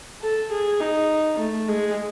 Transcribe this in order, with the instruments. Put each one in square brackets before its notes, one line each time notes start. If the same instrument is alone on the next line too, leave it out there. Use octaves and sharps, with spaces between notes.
[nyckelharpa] A4
G#4
D#4
A3
G#3